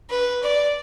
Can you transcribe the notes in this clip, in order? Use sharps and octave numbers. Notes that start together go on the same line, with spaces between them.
B4
D5